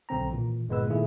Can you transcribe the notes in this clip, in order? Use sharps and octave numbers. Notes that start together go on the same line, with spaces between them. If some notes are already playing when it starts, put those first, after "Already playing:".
B1 D3 C4 A#5
A#2 E3
G1 A#2 G#3 B3 B4 E6
A#2 D#3 A3 E4 G#4